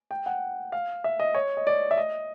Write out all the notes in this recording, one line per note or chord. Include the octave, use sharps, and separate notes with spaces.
G5
F#5
F5
E5
D#5
C#5
D#5
D5
E5
D#5